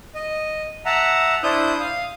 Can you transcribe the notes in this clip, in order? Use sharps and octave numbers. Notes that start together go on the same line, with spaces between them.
D#5
E5 F#5 A5 A#5
D4 E4 C5 D#6 G6
F5 D#6